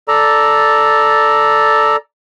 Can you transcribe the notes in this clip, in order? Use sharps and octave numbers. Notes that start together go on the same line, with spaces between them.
A4 D5 A#5